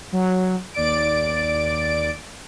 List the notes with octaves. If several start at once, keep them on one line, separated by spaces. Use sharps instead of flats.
F#3
D#2 D5 A6 D7